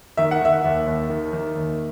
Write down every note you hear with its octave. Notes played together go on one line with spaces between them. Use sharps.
D#3 E5
F#5
D#3 E5
D#2
D#2
D#3
D#3
D#2